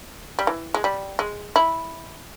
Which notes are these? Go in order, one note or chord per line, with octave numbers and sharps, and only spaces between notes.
G3
E3
G#3
G3
G#3
E4